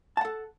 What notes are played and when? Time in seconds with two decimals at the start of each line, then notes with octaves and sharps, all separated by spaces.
0.17 A5
0.21 F#5
0.25 A4